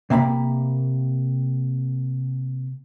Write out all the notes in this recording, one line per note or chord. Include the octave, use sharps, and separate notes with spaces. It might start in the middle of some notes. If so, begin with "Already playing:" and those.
C3 A#3 F5 B5